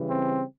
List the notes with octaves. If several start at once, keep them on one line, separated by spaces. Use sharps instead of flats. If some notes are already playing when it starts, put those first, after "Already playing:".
Already playing: C#3 E3 G3
C4